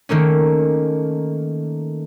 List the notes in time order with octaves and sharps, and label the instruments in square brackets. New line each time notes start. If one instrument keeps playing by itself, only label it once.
[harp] D#3 A3 A#3 C#4